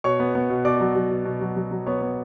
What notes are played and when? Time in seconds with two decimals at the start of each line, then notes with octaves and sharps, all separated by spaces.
0.04 B2 C#5 C#6
0.20 B3
0.35 B3
0.50 B2
0.65 B2 D5 D6
0.80 F#3
0.95 F#3
1.11 B2
1.25 B2
1.41 F#3
1.56 F#3
1.71 F#3
1.86 B3 C#5 C#6
2.01 B3